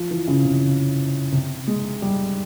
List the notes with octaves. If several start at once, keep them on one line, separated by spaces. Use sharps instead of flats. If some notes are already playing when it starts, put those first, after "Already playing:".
Already playing: F3
E3
C#3
C3
C3
G#3
G3